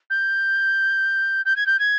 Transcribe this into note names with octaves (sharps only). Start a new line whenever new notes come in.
G6
G6
G#6
G6
G#6